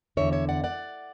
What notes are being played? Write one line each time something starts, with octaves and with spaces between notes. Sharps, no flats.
E2 D3 C#5 E5
C#5 E5
D5 F#5
D5 F#5